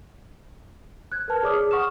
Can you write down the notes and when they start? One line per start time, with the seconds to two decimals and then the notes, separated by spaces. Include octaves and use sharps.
1.12 F#6 G#6
1.28 A#4 B4 A5 F6
1.43 G#4 C#5 D5 D6 D#6 F6
1.56 G#4
1.71 F#5 C#6 D#6 F6 E7